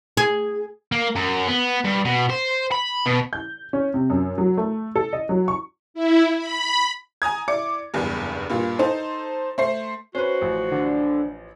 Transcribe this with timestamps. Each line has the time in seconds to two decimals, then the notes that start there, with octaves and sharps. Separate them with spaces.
0.17 G#4
0.92 A#3
1.16 F#2
1.48 B3
1.85 G2
2.05 B2
2.30 C5
2.72 B5
3.06 B2
3.33 G6
3.73 C#4
3.94 C3
4.10 F#2
4.38 F#3
4.57 A3
4.95 A4
5.13 D#5
5.29 F#3
5.48 C#6
5.94 E4
6.37 B5
7.22 G#5 A#5 D#6 G#6
7.48 E4 D5 D6 C#7
7.94 F#1 E2 G2
8.50 G2 A#2 F4
8.79 D#4 A4 C5
9.58 A3 C5 C7
10.15 C#4 F#4 B4 C5
10.41 A1 F3
10.71 D3